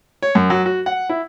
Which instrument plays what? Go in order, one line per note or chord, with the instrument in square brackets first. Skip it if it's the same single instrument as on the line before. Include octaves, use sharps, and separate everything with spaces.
[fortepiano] C#5
F#2
F#3
F#4
F#5
E4